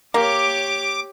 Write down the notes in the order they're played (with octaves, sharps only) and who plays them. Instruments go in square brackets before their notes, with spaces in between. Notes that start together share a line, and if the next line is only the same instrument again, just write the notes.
[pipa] A#3 [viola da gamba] G4 C#5 [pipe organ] D6